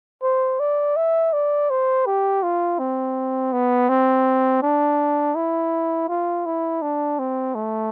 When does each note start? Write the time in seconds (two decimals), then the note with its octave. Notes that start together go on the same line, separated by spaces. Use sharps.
0.23 C5
0.60 D5
0.96 E5
1.33 D5
1.70 C5
2.06 G4
2.43 F4
2.79 C4
3.53 B3
3.89 C4
4.62 D4
5.36 E4
6.09 F4
6.46 E4
6.82 D4
7.19 C4
7.55 A3